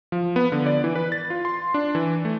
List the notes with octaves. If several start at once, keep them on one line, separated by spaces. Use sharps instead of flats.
F3
B3
D3
D5
E3
B4
A6
F4
C6
D4
E3
A3